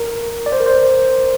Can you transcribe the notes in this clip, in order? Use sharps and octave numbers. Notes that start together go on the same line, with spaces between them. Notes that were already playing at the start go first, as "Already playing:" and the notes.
Already playing: A#4
D5
C5
A#4
C5